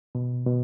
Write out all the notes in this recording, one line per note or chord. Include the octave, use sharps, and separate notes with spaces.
B2
B2